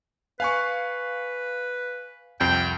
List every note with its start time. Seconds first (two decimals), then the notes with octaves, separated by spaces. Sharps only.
0.40 B4 F5 G#5 C#6
2.40 C2 F2 G5 C7